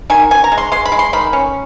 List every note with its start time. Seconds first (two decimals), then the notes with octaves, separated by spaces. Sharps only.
0.10 D#3 G#5
0.31 C#4 G#5
0.44 A#5
0.52 G#3
0.58 C6
0.72 G#3 C6
0.85 B5
0.92 G#3
0.99 C6
1.13 D#3 B5
1.33 C#4